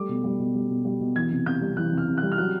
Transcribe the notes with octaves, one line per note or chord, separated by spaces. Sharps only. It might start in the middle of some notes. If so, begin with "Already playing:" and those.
Already playing: G3 A3 D6
B2
G3
B2
G3
B2
G3
B2
E3 G#6
C3
C3 G6
G3
E3 F#6
C3
F6
C3
F#6
G3
F6
F#3 F#6